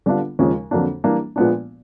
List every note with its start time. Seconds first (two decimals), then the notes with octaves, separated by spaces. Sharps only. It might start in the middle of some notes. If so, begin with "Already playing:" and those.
0.06 D3 G3 B3 D4 F4
0.39 D#2 C#3 F3 G#3
0.71 F2 D3 F#3 A#3 D4
1.04 E3 G3 A#3 D4
1.36 A#2 F3 G#3 B3 D4